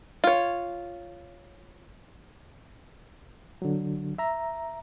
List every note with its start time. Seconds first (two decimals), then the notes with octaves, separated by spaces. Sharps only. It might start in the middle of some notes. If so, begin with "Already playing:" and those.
0.24 F4 C#5
3.62 D3 F#3
4.18 E5 A#5